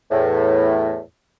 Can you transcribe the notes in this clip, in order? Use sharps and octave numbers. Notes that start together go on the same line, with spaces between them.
E2 A2